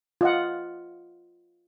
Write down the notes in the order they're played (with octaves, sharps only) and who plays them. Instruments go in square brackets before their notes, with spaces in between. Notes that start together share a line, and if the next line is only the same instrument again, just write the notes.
[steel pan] F4 D#5 F#5